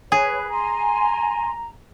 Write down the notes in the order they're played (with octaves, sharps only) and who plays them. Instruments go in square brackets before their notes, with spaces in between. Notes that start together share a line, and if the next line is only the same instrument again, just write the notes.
[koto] G#4 [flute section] B4 [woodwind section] C#5
[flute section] G#5 C6 [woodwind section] A#5